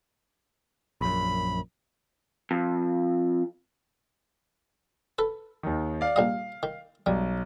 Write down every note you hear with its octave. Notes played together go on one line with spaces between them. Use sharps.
A#1 F#2 B5
F2
A4 B4
D#2 D#3
D5 F5
A#1 G3 D#5 F5
D#3
B1 G3